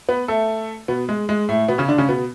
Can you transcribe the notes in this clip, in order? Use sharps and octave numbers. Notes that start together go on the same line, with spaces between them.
B3 B4
A3 A4
B2 B3
G#3
G#3
A2 A3
B2 B3
C#3 C#4
D3 D4
C#3 C#4
B2 B3